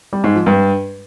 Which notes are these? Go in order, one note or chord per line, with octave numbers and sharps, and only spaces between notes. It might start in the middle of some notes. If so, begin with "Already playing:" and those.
G3
G#2
F3
G2